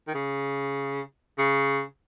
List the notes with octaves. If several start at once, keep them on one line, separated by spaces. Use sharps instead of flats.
D#3
C#3
C#3